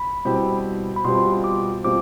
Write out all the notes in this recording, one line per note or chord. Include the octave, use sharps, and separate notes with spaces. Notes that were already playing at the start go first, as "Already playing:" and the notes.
Already playing: B5
B2 G3 C4 E4 G4
B5
B2 G3 C4 F4 C6
D6
B2 G3 C4 F4 D6